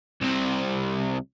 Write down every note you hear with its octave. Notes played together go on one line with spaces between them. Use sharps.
C2 C3